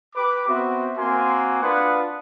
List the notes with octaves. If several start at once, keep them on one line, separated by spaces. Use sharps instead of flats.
G4 B4 B5 D6
B3 C4 F#4 C5 E5
A#3 C4 F#4 G#5 C6
D4 F4 B4 F#5 D#6